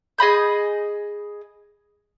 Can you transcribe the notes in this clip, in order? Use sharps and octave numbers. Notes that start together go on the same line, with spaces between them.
G#4 D#5 B5 G6